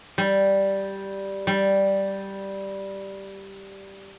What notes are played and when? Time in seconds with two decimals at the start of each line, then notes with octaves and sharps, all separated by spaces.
0.18 G3
1.47 G3